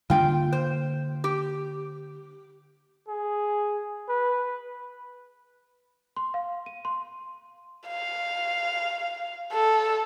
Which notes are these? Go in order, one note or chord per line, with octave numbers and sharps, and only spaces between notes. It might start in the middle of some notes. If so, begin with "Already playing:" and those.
D3 G3 A#3 F4 G5
C5
G4
G#4
B4
C6
F5
D#7
C6
F5
A4